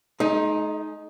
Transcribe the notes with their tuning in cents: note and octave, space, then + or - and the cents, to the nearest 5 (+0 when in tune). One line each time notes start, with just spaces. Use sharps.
G#3 +45 D#4 +0